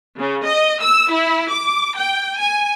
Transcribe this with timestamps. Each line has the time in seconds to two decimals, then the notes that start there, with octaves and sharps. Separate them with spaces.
0.18 C#3
0.46 D#5
0.82 E6
1.12 E4
1.51 D6
1.98 G5
2.40 G#5